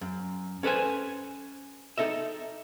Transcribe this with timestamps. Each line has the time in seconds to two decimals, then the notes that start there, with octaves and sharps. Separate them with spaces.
0.01 F#2
0.63 C#4 A4 B4 C5 G#5
1.98 D#4 A4 D#5 E5